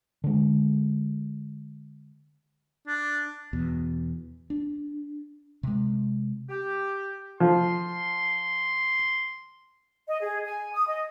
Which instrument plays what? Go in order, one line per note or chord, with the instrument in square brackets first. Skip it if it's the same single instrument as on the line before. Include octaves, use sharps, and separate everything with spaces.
[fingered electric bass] D3 G#3
[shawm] D4
[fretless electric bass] E2 B2
D4
C3 G#3
[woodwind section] G4
[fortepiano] F3 [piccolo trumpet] C6
[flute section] D#5
G#4
G#5
D#6
D#5